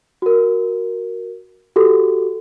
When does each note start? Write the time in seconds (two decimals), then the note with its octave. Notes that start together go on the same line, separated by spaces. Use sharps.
0.22 F#4 A#4
1.76 F#4 G4 A4